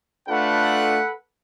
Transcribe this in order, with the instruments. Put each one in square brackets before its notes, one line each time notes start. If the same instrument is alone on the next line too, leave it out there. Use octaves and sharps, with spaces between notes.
[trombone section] A3 D4 F4 [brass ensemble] A4 B4 F#5